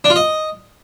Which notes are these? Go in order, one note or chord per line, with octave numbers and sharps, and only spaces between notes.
D4
F4
D#5